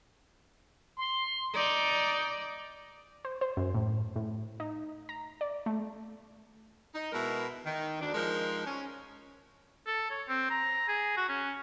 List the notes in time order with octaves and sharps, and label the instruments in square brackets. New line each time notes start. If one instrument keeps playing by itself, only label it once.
[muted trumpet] C6
[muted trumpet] D#4 [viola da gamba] D5
[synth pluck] C5
C5
F#2
A2
A2
D#4
A#5
D5
A3
[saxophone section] D#4
B2 G#3 E4 A#4 E5
D#3
D2 D4
F3 G#3 D#4 A#4
C#4
[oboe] A4
C#5
C4
A#5
G#4
F#4
C#4